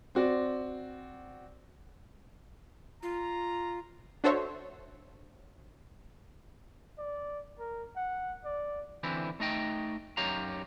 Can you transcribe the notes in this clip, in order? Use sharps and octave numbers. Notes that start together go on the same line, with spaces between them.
C4 F#4 D5
F4 A#5
D4 F#4 A4 C5 C#5 E5
D5
A#4
F#5
D5
D3 E3 C4 E4
A3 D#4 D#5 G5
F#2 D#4 G4 C#5 F5 A#5